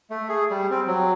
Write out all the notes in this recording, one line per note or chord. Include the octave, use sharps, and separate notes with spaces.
A3
G#4
G3
C4
F#3